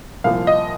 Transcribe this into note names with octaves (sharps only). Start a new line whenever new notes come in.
C2 A#2 F3 F5
D#5